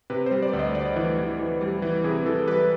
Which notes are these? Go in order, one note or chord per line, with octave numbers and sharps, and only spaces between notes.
C3 B4
C5
G3
D5
D2
D#5
D2 D5
E3
E3
E3
G3
E3
C3 G#4
E3 A4
G3 B4